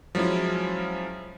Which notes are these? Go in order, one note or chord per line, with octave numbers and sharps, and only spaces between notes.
F3 F#3 G#3 C#4 E4